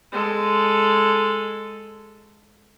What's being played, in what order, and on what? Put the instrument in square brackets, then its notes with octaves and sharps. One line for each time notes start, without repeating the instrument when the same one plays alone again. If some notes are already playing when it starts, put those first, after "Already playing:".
[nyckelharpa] G#3 A4